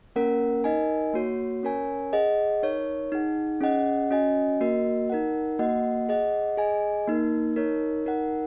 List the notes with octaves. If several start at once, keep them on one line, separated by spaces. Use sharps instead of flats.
A#3 C#4 A#4 F#5
D#4 A#4 D#5 G#5
A#3 F#4 C#5
C#4 A#4 C#5 G#5
G#4 D#5 F#5
D#4 A#4 C#5
D#4 G#4 F#5
C#4 G#4 D#5 F#5
C#4 F#4 D#5 G#5
A#3 F#4 A#4 D#5
D#4 A#4 F#5
A#3 F#4 D#5 F#5
G#4 D#5 F#5
G#4 D#5 G#5
A#3 D#4 A#4
D#4 A#4 C#5
D#4 A#4 F#5